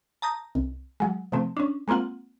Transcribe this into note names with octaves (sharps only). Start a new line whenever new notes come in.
A5 A#5 D#6 G6 A#6
C2
F#3 G#3
C3 F3 A3 C4
C#4 D4
G#3 A#3 C4 F4 F#5